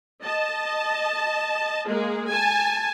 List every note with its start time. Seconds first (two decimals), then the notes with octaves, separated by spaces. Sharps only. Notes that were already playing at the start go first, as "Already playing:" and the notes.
0.23 D#5 A5
1.86 G#3 A#3 G#4
2.28 G#5 A5